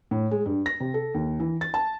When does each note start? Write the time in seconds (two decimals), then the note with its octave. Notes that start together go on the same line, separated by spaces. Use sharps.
0.11 A2
0.31 G#3
0.46 G2
0.66 A#6
0.80 C3
0.94 A4
1.14 D#2
1.40 E3
1.61 A6
1.74 A5